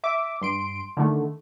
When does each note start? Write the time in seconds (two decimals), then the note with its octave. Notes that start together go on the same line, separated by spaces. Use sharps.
0.04 E5 D6
0.41 G2 C6 D7
0.97 D3 D#3 A3